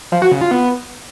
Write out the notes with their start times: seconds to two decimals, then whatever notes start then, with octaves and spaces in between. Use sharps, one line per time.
0.12 F3
0.22 F#4
0.32 C#3
0.41 F4
0.51 B3